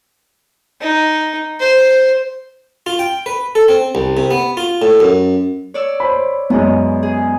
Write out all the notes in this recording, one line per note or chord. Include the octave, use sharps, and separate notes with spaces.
D#4
C5
F4
G5
B4
A4
C4
C2
C3
B3
F4
A2
F#2
C#5 D5 E6
C5 B5
F#2 G#3 B3
G#4